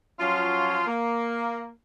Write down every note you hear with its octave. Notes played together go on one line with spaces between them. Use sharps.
F3 F#3 C#4 F4
A#3